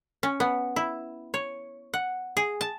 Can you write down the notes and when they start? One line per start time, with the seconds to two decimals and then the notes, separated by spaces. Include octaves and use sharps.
0.23 C#4
0.40 B3
0.76 E4
1.34 C#5
1.94 F#5
2.37 G#4
2.61 A5